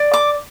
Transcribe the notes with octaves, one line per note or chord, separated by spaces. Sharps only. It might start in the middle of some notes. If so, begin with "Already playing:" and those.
Already playing: D5
D6